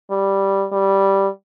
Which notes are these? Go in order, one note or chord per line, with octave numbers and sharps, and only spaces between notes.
G3
G3